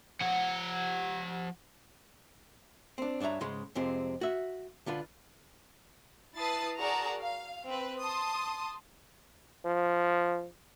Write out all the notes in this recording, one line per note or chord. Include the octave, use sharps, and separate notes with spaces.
F3 F#5
C4 D4
G2 D4 C#5 E5 A#5
G#2 C#3 G#3 C6
F2 C3 G#3 C4
F#4 E5
D3 D4 F4 B4
E4 B4 A5 D#6 A6 C7
F#4 G#4 A#4 D5 A5 A#5
F5
C4 B4
A5 C6 D#6
F3